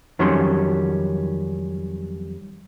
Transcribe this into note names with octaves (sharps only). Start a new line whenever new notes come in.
F2 D#3 F#3 G3 C#4 C6